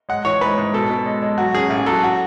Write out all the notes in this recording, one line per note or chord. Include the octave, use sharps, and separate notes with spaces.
G#3 F#5
E3 C#5
G#2 B4
G#2
B2 A4
B2
G#3
G#3
F#3 F#4
C#4 G#4
A1
F#3 A4
F#4